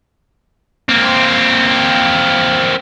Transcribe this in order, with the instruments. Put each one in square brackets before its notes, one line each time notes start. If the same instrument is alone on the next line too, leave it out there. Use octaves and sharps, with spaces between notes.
[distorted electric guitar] A#3 C4